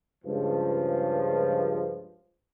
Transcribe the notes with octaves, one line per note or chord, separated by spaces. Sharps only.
C#2 G2 F3